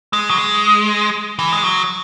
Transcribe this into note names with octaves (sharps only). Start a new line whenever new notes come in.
G#3
F#3
G#3
E3
G#3
F#3